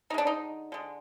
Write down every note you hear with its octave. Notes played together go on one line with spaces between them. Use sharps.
D3 G#3 D4 D#4
D#4
D3 G#3